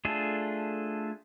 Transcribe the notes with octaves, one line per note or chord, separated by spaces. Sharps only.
A3 D4 F4 G#4 A4